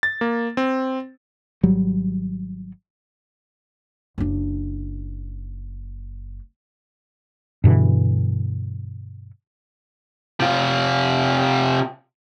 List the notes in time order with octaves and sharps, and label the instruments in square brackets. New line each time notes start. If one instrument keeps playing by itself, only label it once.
[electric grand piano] A6
A#3
C4
[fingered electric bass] G#1 F#3 G3
[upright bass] F#1 D4
[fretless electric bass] G2 B2 D3 E3
[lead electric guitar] C3 F4